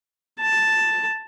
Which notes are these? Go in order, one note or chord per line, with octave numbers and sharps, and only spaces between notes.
A5